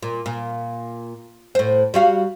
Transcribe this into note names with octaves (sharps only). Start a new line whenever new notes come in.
A#2
A#2
A2 C5
G3 F#4 F5